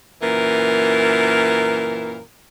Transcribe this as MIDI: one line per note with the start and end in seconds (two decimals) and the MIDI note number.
0.22 2.20 42
0.22 2.20 46
0.22 2.20 52
0.22 2.20 70